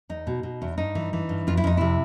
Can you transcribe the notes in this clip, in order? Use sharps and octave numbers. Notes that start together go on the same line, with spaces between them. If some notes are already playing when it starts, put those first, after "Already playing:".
E2 D#4
B2
B2
E2
G2 D#4
E3
E3
G2
F2 F4
E4
F2 D#4
C3 E4